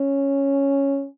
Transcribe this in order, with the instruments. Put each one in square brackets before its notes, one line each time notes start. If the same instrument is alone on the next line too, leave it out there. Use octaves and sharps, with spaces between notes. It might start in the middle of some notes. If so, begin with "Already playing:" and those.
Already playing: [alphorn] C#4